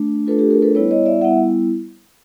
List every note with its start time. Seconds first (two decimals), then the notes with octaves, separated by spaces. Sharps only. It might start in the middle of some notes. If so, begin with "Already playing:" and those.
Already playing: A3 D4
0.27 A3 D4 F4 A4 B4
0.39 G4 A4
0.50 G#4 A#4
0.62 A4 B4
0.75 G3 B3 E4 B4 C#5
0.91 C#5 D#5
1.06 D5 E5
1.22 G3 B3 E4 E5 F#5